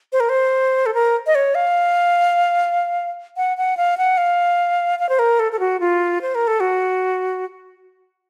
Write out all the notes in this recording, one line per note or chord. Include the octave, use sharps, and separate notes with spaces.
C5
A#4
C5
A4
A#4
D#5
C#5
F5
F#5
F#5
F5
F#5
F5
F5
C5
A#4
A4
A4
F#4
F4
C5
A#4
A4
F#4